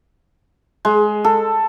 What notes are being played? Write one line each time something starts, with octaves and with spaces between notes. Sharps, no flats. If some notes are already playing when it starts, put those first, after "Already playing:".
G#3
A4